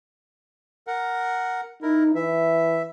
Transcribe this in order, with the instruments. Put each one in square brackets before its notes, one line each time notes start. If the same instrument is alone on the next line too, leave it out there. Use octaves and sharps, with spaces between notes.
[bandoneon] A#4 F#5
[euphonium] D#4 [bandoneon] E4 A#4
[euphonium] E3 [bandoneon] E5